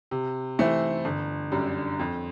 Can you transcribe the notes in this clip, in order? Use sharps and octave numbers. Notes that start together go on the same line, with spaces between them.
C3
E3 A3 C4 E4
G1
F#2 D3 G3
F2